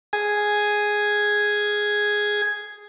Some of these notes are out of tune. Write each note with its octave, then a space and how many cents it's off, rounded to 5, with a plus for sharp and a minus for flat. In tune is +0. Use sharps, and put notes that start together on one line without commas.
G#4 +0 G#5 +0